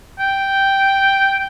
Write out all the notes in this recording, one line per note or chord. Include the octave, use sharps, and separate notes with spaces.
G5